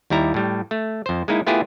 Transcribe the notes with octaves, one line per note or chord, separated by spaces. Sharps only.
D#2 G3 E4 A#5
A2 G3
A3
F2 C5
G#3 A#3 D#4 E4
A3 B3 E4 F4 G4 G#4